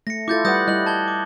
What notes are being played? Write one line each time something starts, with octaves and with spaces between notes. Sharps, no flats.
A3 A#6 C#7
E4 F4 A4 D6 G6 A6
G3 B4 F#5 D#6 G6 A#6
G3 E4 D#5 F#6 F#7
A5 G#6 G7
D6